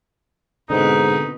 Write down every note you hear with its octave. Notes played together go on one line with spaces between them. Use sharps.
G#2 B2 D3 C4 D#4 B4